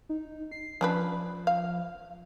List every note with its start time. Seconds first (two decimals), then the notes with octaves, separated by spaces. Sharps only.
0.09 D#4
0.51 C7
0.81 F3 C#4 D4 B4
1.47 F5